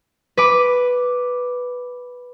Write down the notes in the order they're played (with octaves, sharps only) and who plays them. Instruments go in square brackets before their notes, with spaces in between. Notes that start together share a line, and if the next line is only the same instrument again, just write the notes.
[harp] B4 D6